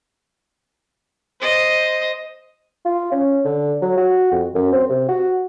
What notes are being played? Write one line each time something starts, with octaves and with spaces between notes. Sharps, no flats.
C5 D#5
F4
C#4
D3
F#3
F#4
F2
F#2
C4
C3
F#4